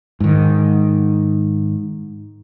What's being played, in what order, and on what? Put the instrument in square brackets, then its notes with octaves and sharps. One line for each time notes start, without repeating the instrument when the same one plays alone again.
[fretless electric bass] G#2 D#3